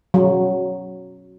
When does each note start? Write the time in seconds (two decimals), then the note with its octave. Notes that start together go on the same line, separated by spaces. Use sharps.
0.14 F#3